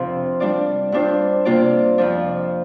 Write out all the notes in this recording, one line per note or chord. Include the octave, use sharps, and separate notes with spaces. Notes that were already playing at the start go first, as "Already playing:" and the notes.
Already playing: F2 C3 F3 C4 D4 F4 D5
G3 D4 F4 D5
G2 G3 D4 F4 C5
C3 A#3 F4 D5
F2 F3 D4